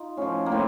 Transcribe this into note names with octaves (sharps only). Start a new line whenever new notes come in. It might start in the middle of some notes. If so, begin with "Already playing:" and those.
Already playing: D#4 F4
A2 F3 C#4
A#3
A2 C4